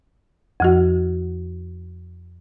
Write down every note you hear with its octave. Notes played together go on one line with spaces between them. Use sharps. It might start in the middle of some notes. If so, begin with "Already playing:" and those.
F2 F3 F#4